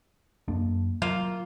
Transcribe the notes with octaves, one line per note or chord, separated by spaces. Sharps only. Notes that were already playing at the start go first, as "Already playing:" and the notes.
F#2 A#3 D4
F#3 A#3 F4